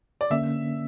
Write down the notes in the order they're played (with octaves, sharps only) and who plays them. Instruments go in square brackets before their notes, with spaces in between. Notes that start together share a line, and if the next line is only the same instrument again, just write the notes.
[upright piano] D5
[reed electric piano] D3 A#3 C#4 [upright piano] E5